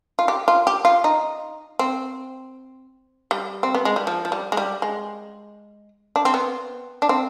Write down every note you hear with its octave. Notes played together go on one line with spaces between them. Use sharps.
F4
G4
F4
G4
F4
D#4
C4
G3
C4
B3
G#3
G3
F3
F3
G3
G#3
G3
G#3
D4
C4
B3
D4
C4